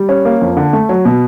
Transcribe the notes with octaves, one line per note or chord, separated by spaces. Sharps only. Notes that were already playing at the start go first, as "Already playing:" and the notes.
Already playing: G3
C#4
A#3
F2
D3
A3
F#3
B2